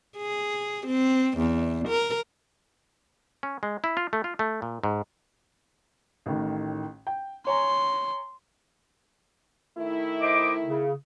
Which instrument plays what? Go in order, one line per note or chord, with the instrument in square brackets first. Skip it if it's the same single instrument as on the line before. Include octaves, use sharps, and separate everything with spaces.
[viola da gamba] G#4
C4
E2
A#4
[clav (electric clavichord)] C#4
G#3
E4
F4
A3
F4
A3
A#2
G#2
[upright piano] A1 A2 D#3
G5
[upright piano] C#5 G#5 A#5 [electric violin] C6
[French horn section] D#3 A3 E4
[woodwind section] C5 D#5 D6
C#3